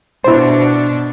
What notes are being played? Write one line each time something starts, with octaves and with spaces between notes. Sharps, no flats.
B2 D4 E4 C5